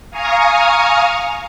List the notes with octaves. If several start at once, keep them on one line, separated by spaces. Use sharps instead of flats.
F5 G#5 A#5 C#6 D#6 F6